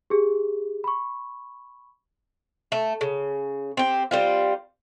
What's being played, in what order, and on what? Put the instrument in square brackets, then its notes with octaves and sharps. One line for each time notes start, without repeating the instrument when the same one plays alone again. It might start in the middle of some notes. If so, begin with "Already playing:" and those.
[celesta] G4 G#4
B5 C#6
[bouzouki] A3
C#3
C4 G4
G3 C4 F4